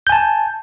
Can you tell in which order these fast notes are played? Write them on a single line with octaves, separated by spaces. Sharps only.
G6 G#5 A5